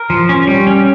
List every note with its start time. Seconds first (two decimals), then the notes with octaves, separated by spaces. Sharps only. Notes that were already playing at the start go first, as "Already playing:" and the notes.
Already playing: A#4
0.10 F3
0.29 C#4
0.47 G3
0.67 C#4